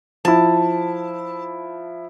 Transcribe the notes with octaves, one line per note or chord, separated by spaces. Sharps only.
F3 E4 A5